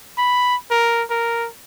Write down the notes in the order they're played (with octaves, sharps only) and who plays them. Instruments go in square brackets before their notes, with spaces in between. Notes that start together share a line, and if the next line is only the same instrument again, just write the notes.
[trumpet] B5
A#4
A#4